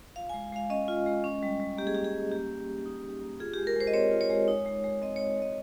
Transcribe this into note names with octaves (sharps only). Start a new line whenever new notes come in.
F4 F5
G#3 G#5
G#3 F5
C#4 D#5
F4
G#3
C#4
G3
G3
A#3 G4
G#4
C#4 G4
G#4
G3
A#3 G4
A#3
D#4
D#4
A#3
A#3
F4 G#4
G#3 G4
A#4
G#3 C5
D#5
C4 C#5
F4
C#5
G#3
D#4
G#3
G#3
C4 D#5
D#4 C#5
G#3 D#5